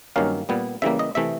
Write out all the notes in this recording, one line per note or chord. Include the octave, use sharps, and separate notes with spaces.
G2 D#3 F#3 A#3 C#4 F5
A#2 G3 B3
C#3 E3 G3 A#3 E5
D#5
C3 E3 A3 E5